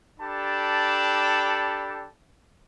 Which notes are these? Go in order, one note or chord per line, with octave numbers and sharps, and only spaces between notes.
D4 G4 A4 A5 B5